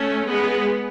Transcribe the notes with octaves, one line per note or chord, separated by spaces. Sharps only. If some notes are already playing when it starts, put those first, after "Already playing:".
Already playing: A3 C#4
G#3 B3